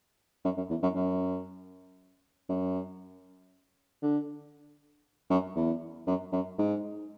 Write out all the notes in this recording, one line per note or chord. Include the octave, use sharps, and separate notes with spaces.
F#2
F#2
E2
F#2
F#2
F#2
D3
F#2
E2
F#2
F#2
G#2